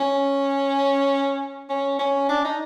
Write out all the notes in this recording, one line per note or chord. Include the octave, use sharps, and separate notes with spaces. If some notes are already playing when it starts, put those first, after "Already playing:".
Already playing: C#4
C#4
C#4
D4
D#4